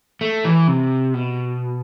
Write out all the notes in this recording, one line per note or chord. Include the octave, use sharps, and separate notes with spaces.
A3
E3
C3
B2